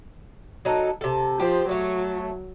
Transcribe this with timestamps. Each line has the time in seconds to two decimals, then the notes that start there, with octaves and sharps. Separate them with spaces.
0.65 F#3 D#4 A4
1.01 C3 A4
1.40 F3 G4 C5
1.69 F#3 A3 C#5